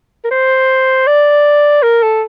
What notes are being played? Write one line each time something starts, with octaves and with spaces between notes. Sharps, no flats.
A#4
C5
D5
A#4
A4